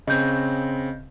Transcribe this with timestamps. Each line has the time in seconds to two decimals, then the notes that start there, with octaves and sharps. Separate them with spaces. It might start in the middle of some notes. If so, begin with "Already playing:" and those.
0.07 C#3 C4 D#5 G6